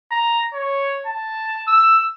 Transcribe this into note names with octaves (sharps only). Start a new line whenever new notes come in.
A#5
C#5
A5
E6